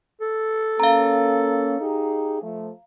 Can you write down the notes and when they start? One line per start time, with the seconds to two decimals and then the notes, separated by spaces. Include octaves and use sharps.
0.21 A4
0.80 A#3 C#4 F5 A#5
1.80 D#4 G4 G#4
2.42 F3 A3